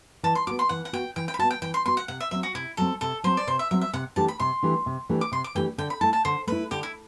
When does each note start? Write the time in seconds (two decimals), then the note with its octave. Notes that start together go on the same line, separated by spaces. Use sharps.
0.23 E3 A5
0.35 C6
0.47 F#4 D6
0.51 B3
0.59 C6
0.69 E3 F#5
0.85 F#5
0.93 B3 F#4 G5
1.16 E3 G5
1.28 G5
1.34 B5
1.39 F#4 A5
1.43 B3
1.51 G5
1.62 E3 G5
1.74 C6
1.86 B3 F#4 C6
1.97 F#5
2.08 C3 F#5
2.20 E5
2.31 F#3 C4 E5
2.43 F#4
2.55 C3 E4
2.77 F#3 C4 A4
3.01 C3 A4
3.24 F#3 C4 C5
3.37 D5
3.47 C3 C5
3.59 E5
3.71 F#3 C4 E5
3.81 E5
3.93 C3 F#5
4.16 E3 A3 D4 G4 A5
4.28 B5
4.40 C3 C6
4.63 E3 A3 D4 G4
4.86 C3
5.09 E3 A3 D4 G4
5.21 D6
5.32 C3 C6
5.44 D6
5.55 E3 A3 D4 G4 G5
5.78 D3 G5
5.90 B5
6.01 A3 E4 A5
6.13 A5
6.25 D3 C5
6.47 A3 E4 B4
6.71 D3 G4
6.83 E4